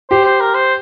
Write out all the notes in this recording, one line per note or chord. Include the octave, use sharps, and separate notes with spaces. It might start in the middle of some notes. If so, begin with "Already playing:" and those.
G4 C5
C5
A#4
C5